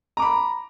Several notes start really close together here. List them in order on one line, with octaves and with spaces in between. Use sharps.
A#5 D6 B5